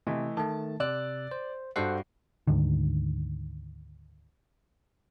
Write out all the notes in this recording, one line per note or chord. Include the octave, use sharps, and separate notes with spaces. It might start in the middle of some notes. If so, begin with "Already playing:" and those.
C3 E3 A3 D#5
D#3 A3 A5
C3 D5 E6 F#6
C5
G2 F#4 A4 C5 F#5 C7
D2 G#2 D3 D#3